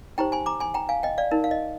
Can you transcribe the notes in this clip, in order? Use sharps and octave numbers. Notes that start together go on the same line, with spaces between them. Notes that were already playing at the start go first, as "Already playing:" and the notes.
D#4 G4 C5 G5 A#5
G#5 C6
A#5 D6
G#5 C6
G5 A#5
F5 G#5
D#5 G5
D5 F5
D#4 A#4
F5
D#5